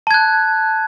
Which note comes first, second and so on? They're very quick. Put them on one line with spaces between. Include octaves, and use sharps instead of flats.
A5 G#6 F#6